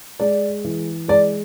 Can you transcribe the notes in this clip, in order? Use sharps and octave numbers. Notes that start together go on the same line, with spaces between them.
G#3 D5
E3
G#3 D5